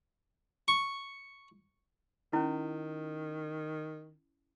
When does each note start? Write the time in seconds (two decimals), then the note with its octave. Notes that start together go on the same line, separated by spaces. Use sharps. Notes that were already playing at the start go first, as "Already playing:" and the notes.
0.68 C#6
2.33 D#3 C#4 E4